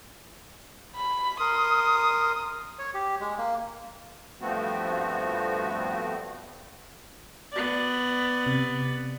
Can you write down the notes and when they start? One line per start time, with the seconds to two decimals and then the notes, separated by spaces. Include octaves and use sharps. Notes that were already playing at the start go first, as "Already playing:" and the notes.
0.96 B5
1.40 A#4 C6 D#6
2.79 C#5
2.94 G4
3.21 G#3
3.38 A#3
4.41 G2 F3 A3 B3 C4 F#4
7.52 B3 D5
8.46 C3